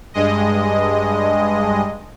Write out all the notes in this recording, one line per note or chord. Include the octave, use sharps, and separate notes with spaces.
G2 G#3 D#5